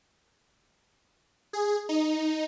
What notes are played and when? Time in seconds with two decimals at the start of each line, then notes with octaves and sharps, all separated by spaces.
1.53 G#4
1.89 D#4